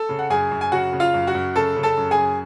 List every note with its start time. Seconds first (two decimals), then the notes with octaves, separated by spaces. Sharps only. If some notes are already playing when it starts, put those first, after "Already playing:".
Already playing: A4 A5
0.09 C#3
0.19 F#5
0.30 F#2 G#4 G#5
0.51 F#2
0.61 G#5
0.72 C#3 F#4 F#5
0.93 C#3
1.00 F4 F5
1.14 F#2
1.27 F#4 F#5
1.35 F#2
1.56 C#3 A4 A5
1.76 C#3
1.83 A4 A5
1.97 F#2
2.11 G#4 G#5
2.18 F#2